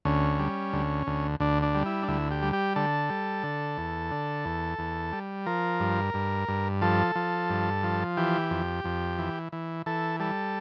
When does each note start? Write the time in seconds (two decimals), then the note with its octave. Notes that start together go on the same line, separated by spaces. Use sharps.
0.05 D2 C#4
0.39 G3
0.73 D2
1.07 D2
1.40 D2 D4
1.63 D4
1.74 G3
1.86 E4
2.03 D4
2.08 D2 E4
2.31 G4
2.42 G3
2.53 G4
2.76 D3 A4
3.10 G3
3.43 D3
3.78 E2
4.11 D3
4.45 E2
4.79 E2
5.13 G3
5.46 F3 A#4
5.80 G2
6.14 G2
6.48 G2
6.82 F3 A4
7.15 F3
7.50 G2
7.83 F3
8.17 E3 G4
8.51 F2
8.84 F2
9.18 E3
9.52 E3
9.86 E3 A4
10.20 G3 A4